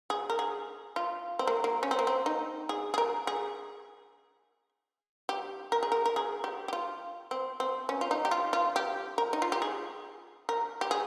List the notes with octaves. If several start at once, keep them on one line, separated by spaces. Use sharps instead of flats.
G#4
A#4
G#4
F4
C4
A#3
A#3
C#4
C4
A#3
C4
D#4
G#4
G#4
A#4
G#4
G4
A#4
G#4
A#4
A#4
G#4
G4
G4
F4
C4
C4
C#4
F4
D#4
G4
F4
F4
G4
A#4
D#4
F4
G4
G#4
A#4
G4
G#4